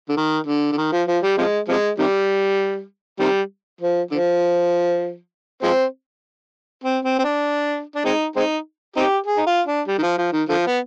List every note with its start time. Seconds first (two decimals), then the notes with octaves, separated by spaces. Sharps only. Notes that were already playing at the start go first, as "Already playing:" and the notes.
0.09 D3
0.17 D#3
0.47 D3
0.72 D3
0.78 D#3
0.92 F3
1.08 F3
1.23 G3
1.38 C3 F3 G#3
1.68 C3 F3 G#3
1.98 C3 D#3 G3
3.20 C3 D#3 G3
3.81 F3
4.11 D3 F3
5.63 F3 G#3 C4
6.84 C4
7.05 C4
7.19 C4
7.24 D4
7.96 D4
8.05 G#3 C4 D#4
8.36 G#3 C4 D#4
8.96 C4 D#4 G4
9.26 G#4
9.37 D#4
9.47 F4
9.67 D4
9.88 G3
9.98 D#3
10.03 F3
10.18 F3
10.33 D#3
10.48 D3 F3
10.67 B3